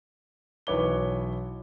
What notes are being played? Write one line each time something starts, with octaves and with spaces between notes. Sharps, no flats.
B1 E3 B4 C#5 D6 G7